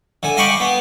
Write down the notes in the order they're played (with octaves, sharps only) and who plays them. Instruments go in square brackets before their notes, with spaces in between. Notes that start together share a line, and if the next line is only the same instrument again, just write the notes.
[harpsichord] D3 G#5
D#5 F5 G5 B5 C#6 D6
B3